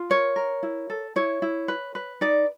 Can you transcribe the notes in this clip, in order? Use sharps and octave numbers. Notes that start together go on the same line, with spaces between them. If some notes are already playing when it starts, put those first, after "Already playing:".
Already playing: F4
A#4 C#5
A#4
E4
A4
E4 C#5
E4
B4
B4
D#4 D5